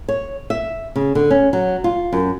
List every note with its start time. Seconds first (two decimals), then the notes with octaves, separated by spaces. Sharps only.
0.08 C#5
0.50 E5
0.96 C#3
1.15 D3
1.30 C#4
1.53 F#3
1.84 F4
2.13 F#2